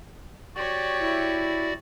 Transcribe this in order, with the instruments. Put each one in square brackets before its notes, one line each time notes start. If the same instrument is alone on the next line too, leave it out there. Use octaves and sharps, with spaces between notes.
[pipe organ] F#4 D5 [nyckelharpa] G4 C#5
[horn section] E4